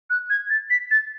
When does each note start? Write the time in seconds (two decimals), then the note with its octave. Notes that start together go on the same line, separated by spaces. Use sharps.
0.10 F#6
0.30 G#6
0.50 A6
0.70 B6
0.91 A6